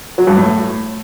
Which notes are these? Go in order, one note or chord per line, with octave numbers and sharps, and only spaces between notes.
F#3
G2
A2